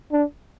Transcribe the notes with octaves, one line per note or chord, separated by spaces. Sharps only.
D4